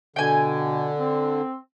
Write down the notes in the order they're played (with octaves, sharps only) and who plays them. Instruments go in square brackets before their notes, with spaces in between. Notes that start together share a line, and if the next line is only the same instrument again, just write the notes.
[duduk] B2 [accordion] D3 [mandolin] G5 G#5
[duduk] C4